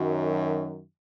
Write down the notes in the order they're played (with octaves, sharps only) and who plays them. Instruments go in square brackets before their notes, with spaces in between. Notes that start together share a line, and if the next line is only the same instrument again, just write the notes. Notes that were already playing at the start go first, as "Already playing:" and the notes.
Already playing: [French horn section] F#2 D#3 F#3